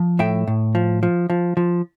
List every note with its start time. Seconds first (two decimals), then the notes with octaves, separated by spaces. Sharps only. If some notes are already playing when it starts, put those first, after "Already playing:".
Already playing: F3
0.19 A2 E5 G5
0.47 A2
0.75 F3
1.03 F3
1.30 F3
1.57 F3